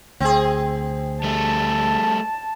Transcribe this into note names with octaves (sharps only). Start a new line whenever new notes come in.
D2 C4 G#4
G3 A3 A5